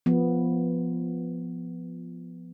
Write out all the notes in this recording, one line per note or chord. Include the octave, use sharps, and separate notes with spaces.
F3 B3